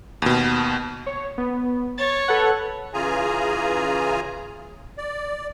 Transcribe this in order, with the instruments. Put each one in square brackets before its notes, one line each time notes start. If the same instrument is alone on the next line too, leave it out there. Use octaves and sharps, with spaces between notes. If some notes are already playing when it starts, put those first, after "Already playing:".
[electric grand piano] D#2 B2
[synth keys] C#5
B3
[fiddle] C#5 [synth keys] A6
[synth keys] A4 B4 F#5
[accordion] C#3 E3 F4 G#4 G#5 A#5
D5